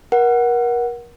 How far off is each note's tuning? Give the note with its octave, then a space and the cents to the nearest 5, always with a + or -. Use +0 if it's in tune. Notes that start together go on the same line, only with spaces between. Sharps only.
A#4 +35 F#5 +0